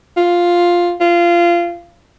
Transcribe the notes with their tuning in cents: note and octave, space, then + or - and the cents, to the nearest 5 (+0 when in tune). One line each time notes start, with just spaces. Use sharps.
F4 +5
F4 -20